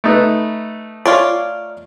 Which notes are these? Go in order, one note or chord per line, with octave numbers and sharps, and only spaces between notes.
A3 D#4 B4
F4 C#5 D5